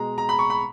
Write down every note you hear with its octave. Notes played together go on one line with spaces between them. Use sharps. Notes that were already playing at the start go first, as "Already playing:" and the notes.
Already playing: B2 G#3 A#5
A#5
B5
C#6
B5